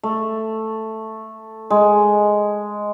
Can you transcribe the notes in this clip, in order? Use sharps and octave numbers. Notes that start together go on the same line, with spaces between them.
A3
G#3